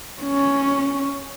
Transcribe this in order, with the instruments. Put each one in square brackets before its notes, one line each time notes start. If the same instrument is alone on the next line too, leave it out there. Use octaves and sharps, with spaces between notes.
[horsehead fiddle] C#4